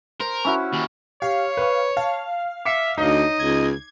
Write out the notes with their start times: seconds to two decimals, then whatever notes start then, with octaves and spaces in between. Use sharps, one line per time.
0.20 A#4 C5
0.45 C#4 E4 F#4
0.73 D#2
1.22 G4 C#5 F5
1.57 B4 C#6
1.97 F5 A5
2.65 E5 D6 C7 C#7
2.98 D2 D#4 C#5 D#5
3.39 C#2 G#6